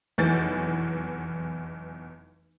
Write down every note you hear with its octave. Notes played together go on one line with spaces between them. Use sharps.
F1 B1 E2 E3 G6 A6